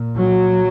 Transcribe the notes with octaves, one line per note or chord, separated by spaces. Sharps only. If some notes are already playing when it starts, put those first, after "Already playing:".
Already playing: A#2
F#3